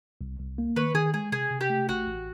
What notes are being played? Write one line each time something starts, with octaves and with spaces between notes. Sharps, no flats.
C2
C2
A#3
D#3 B4 C#5
D#3 G#4
G#3 G#4
C3 G#4
C3
G4
A3
A1 F#4
A1